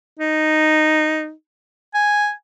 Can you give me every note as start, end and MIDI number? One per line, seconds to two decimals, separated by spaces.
0.19 1.32 63
1.95 2.31 80